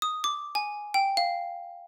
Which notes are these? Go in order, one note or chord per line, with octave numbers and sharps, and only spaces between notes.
D#6
D6
G#5
G5
F5